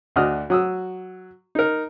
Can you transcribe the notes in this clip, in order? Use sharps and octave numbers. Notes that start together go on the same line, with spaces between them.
D2 D4 F#4 D#5 D#6 F6
F#3 D#6 E6
D#4 A#4